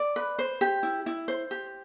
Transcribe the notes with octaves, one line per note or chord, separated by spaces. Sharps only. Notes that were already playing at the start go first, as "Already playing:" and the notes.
Already playing: D5
B4
C5
G4
E4
E4
C5
G4